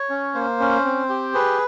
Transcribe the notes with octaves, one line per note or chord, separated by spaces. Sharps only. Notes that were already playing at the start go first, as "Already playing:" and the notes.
Already playing: C#5
C#4
A#3 C5
C#4
C4
G4
G#4 B4